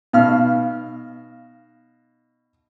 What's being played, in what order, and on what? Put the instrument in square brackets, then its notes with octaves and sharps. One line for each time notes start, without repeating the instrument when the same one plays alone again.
[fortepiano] B2 F6 [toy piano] D#4 F5